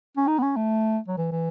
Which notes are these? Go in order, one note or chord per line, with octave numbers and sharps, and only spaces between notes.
C#4
D#4
B3
C#4
A3
F#3
E3
E3